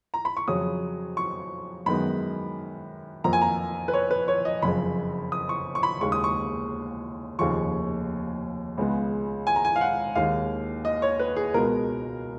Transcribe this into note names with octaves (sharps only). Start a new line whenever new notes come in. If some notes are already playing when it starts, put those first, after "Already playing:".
A#5
B5
C#6
F2 C#3 F#3 D#6
C#6
F#2 D#3 G#3 B3 B5
F2 F3 A#3 A#5
G#5
A#5
B4
C#5
B4
C#5
D#5
F#1 F2 C#3 B5
D#6
C#6
C#6
B5
D#2 C#3 G#3 C#6
D#6
C#6
F1 D#2 C#3 F3 C#6
C#2 C#3 G#3 B3
G#5
A#5
G#5
F5
F#5
D#2 D#3 G#3 F5
D#5
C#5
B4
G#4
C#2 B2 G#3 B3 A#4